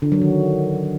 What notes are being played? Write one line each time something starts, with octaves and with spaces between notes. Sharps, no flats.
D3
F#3
D#3